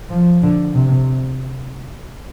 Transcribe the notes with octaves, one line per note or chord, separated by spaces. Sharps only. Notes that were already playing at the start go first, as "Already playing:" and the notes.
F3
D3
C3